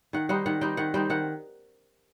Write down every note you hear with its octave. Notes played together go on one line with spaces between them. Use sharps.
D#3 F#5
G3 C4 D#4 F#5
D#3 F#5
G3 C4 D#4 G5
D#3 F#5
G3 C4 D#4 G5
D#3 F#5